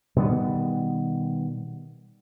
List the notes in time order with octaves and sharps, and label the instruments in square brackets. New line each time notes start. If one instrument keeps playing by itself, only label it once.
[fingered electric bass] B2 D#3 G3 B3